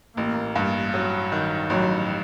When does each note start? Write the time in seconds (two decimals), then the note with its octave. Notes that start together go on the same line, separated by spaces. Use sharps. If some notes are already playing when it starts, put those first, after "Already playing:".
0.17 A1 A#3
0.56 G2
0.94 F#3
1.32 D#3
1.70 A1 F#3